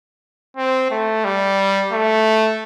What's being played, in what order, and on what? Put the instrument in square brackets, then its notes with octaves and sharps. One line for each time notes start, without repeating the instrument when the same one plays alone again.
[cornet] C4
A3
G3
A3